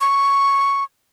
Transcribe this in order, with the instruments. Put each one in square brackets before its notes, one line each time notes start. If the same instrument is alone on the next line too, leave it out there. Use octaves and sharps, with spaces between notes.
[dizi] C#6